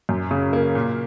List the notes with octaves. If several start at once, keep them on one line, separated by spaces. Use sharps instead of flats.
F#2
C#3
A#3
A#2